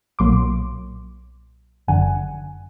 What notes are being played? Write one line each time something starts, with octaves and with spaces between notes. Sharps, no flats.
B1 A#2 F#3 A#3 C6 D6
G1 F#2 D3 F#5 G#5